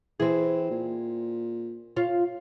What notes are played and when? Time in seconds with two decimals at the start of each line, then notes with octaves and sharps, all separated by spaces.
0.20 E3 C4 G#4
0.71 A#2
1.97 F4 C#5